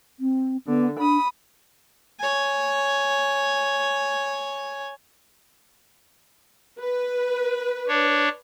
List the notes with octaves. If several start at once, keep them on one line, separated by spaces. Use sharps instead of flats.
C4
D3 B3
D4 B5 D#6
C#5 G#5
B4
D4 C#5